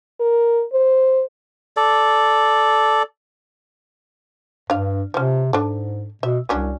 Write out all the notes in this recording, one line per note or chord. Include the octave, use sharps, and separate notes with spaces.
A#4
C5
A4 D5
G2 D4 F5
C3 F3 C#4
G#2 D4 A4
B2 E5
C2 F#3 C#4 D4